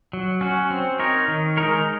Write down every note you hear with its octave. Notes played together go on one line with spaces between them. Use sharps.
F#3
C#4 F#4
C4
D#4 A#4 C#5
D#3
G#3 D#4 A#4 C#5